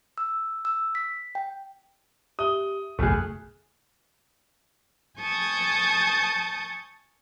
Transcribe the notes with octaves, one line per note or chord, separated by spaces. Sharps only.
E6
E6
B6
G5
G4 E5 D#6 G7
F#1 B1 E2 A3 G#4 G#5 F6 F#6
G#5 A5 C#6 D#6 G6